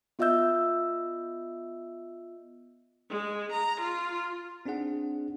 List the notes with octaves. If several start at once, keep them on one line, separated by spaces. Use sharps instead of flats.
B3 F4 D#5 E5 E6 G6
G#3
A#5
F4
C4 D4 D#4 G#4 F#5